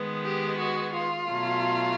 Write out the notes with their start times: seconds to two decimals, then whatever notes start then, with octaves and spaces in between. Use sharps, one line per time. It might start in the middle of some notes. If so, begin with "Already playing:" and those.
Already playing: D#3 G#3 B3
0.22 G4
0.57 F#4
0.93 F4
1.30 B2 F#3 A3